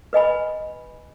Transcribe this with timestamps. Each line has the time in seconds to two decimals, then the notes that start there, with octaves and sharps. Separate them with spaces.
0.13 B4 D#5 G#5 B5